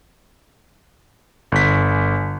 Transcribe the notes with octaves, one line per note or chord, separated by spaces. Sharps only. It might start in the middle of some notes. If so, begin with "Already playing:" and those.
G1 B6